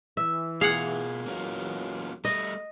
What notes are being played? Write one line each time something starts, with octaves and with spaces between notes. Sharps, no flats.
E3 E5
B2 F4 G#4 F5 F#5
E2 F#3 A#3 C#4 F4
G3 A3 D#5